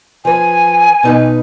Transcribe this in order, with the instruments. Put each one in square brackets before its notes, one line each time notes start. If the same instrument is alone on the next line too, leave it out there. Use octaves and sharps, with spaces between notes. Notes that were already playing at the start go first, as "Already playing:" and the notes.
[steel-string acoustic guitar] F3 B4 [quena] G#5
[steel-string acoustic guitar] B2 D#4 B4